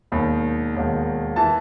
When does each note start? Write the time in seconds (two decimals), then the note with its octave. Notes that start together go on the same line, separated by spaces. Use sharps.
0.12 E1 D#2 D#3 B5
0.74 E1 D#2 D#3
1.36 E3 A5